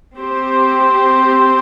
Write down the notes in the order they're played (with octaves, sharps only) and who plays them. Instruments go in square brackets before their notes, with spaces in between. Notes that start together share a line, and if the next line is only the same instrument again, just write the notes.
[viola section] C4 G4 C5